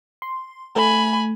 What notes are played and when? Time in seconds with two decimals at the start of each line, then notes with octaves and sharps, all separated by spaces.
0.22 C6
0.76 A3 G#5 B5